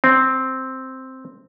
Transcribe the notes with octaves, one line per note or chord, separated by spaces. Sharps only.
C4